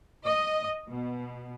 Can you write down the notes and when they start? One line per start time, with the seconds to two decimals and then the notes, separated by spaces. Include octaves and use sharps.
0.25 D#5
0.89 B2